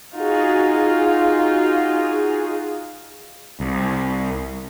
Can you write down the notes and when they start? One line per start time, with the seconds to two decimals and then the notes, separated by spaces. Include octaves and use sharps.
0.16 D#4 F4 F#4 G#4
3.60 C2